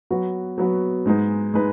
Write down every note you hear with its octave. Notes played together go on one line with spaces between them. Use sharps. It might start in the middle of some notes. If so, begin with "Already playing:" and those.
F#3 B3 F#4 B4
F#3 B3 F#4 B4
G#2 G#3 D#4 B4
G#3 D#4 B4